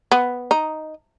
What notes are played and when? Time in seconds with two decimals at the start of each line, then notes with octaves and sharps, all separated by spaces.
0.11 B3
0.51 D#4